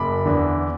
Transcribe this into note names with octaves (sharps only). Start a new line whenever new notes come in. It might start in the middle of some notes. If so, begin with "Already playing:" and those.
Already playing: F#1 B5 D6
E2 D3